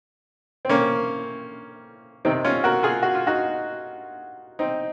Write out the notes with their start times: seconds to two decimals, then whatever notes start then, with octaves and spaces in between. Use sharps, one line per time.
0.65 C4
0.69 A#3 C#4
2.25 C3 D#3 C4 D#4
2.45 C#4 F4
2.64 F#4 A#4
2.83 F4 G#4
3.03 F#4
3.15 F4
3.27 D#4 F#4
4.59 C4 D#4